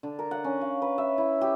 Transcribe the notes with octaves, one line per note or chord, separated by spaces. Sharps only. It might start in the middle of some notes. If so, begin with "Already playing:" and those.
D3
A#4
F#5
C#4
F5
B4
E5
E4
G4